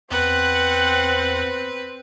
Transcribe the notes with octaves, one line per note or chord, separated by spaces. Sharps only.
E2 C4 B4 F#5